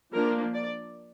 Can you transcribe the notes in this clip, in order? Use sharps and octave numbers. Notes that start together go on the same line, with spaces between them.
F3 A#3 D4 A#4
D5